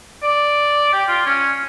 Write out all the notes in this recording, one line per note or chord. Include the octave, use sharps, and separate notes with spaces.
D5
G4
F4
C#4